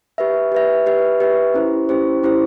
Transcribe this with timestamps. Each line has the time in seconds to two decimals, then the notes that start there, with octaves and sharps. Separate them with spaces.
0.18 G4 B4 E5
0.52 G4 B4 E5
0.86 G4 B4 E5
1.20 G4 B4 E5
1.54 C#4 E4 G4 C5
1.89 C#4 E4 G4 C5
2.23 C#4 E4 G4 C5